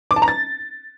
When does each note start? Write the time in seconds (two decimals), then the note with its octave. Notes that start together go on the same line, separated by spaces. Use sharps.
0.11 D6
0.16 A5
0.22 A#5
0.28 A6